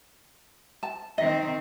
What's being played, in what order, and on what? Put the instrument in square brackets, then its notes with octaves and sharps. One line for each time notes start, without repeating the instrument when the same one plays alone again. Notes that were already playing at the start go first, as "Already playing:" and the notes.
[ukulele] A5
[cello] D#3 C4 [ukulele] D#5